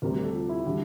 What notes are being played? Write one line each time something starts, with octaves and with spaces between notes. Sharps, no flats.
D2 C3 G3 A#4
G4
A4
F4
E4
D3 G3